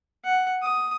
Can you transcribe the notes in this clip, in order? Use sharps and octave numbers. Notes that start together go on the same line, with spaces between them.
F#5
D#6